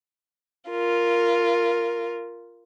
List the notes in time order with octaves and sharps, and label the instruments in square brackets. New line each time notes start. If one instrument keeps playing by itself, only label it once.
[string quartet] F4 A#4